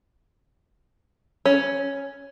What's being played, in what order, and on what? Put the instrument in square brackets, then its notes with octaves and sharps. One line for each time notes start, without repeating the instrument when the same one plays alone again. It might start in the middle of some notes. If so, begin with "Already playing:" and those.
[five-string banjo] C#4